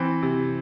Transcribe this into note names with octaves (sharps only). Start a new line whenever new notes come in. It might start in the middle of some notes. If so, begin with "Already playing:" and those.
Already playing: E3 C4
C3